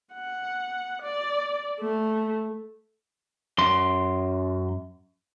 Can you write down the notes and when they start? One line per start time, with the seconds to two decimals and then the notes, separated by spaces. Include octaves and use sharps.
0.14 F#5
1.02 D5
1.80 A3
3.58 F#2 C6